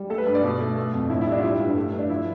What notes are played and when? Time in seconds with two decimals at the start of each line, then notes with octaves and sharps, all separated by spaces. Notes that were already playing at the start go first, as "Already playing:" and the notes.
Already playing: G3
0.10 A3 A4
0.18 B4
0.26 G2
0.35 D5
0.43 B2
0.60 A3
0.76 A3
0.94 F2
1.10 A2 E4
1.21 E4
1.26 G3
1.32 D4
1.38 F4
1.43 G3 E4
1.60 G2
1.76 A3
1.93 G2
1.98 D4
2.10 F3 E4